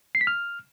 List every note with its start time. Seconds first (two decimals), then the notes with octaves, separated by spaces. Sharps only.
0.15 C7
0.21 B6
0.27 F6